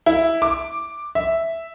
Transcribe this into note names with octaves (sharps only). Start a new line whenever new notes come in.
E4
D6
E5